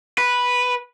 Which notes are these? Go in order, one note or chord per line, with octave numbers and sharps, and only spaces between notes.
B4